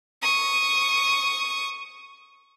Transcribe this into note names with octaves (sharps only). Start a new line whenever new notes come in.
C#6 D#6